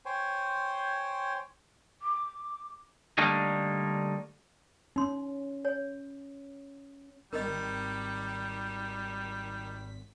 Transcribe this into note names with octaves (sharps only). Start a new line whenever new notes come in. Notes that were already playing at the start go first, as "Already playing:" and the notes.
C5 C#5 G5 G#5 C6
D6
D3 G3 A3 A#3 D4 D#4
C#4 D#4 C6
C#5 G#5
G#1 D#3 G3 A#4 D#5 B6